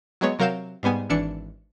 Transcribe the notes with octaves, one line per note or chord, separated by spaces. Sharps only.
F#3 G#3 B3 C#5
C3 F#3 A#4 F5 G6 E7
G#2 G3 B3 G#5
G#1 E3 D4 C#7